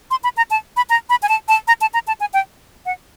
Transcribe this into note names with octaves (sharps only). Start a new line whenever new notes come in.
C6
B5
A#5
A5
B5
A#5
B5
G#5
A5
A5
A#5
A5
A#5
A5
G#5
G5
F#5